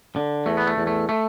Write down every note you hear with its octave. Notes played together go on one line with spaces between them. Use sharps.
D3
E2 A3
B3
A3
E2
A3
A3